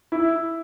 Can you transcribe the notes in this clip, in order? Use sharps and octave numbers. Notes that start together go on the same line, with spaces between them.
E4